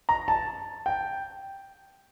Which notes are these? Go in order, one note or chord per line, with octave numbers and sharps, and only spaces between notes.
A#5
A5
G5